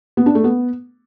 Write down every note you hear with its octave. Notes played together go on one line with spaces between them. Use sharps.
B3
D4
A3
B3